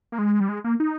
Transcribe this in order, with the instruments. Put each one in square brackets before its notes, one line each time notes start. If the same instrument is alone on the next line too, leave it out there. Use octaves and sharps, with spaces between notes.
[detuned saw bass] A#3
G#3
G3
G#3
A#3
D#4